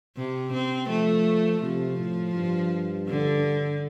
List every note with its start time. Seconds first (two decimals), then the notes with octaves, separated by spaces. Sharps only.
0.17 C3
0.53 C4
0.89 F3 A3
1.62 C3 F3
1.98 A2
2.35 G2
3.08 D3